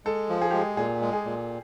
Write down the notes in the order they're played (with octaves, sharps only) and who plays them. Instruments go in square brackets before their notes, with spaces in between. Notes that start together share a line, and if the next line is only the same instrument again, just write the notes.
[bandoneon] G#3 [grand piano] A4
[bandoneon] F3
[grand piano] G#4
[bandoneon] G#3 [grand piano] G4
[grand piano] G#4
[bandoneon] A#2 [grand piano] G#4
[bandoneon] G#3
[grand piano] G#4
[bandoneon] A#2